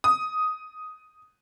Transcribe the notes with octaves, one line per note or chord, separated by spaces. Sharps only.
D#6